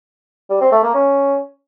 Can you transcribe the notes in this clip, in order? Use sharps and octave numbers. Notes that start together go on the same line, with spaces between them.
G3
C4
A3
A#3
C#4